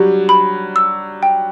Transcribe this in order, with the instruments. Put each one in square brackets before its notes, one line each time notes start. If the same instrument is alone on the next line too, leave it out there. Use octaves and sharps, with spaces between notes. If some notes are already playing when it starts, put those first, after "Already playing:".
Already playing: [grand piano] F#3 G3 D4 [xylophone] G4
[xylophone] B5
E6
G5